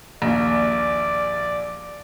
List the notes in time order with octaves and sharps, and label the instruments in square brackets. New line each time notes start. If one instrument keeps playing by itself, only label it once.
[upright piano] A#1 D#2 [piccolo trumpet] D5